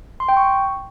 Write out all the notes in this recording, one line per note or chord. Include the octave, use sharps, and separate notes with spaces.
C6
G5
C#6